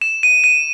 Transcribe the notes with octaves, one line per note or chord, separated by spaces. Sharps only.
E7
D#7
D#7